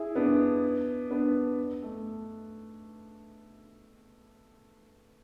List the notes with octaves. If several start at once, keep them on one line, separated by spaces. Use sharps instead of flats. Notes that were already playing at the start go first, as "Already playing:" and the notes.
Already playing: E4 G#4
B3 D4
B3 D4
A3